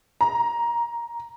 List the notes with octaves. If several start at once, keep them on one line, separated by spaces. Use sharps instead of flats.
A#5